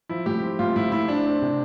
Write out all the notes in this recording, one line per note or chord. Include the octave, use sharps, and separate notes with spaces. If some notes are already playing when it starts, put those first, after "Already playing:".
F3 E4
A2 G4
C4
A2 F4
A2 E4
A2 E4
C4 D4
C4
C3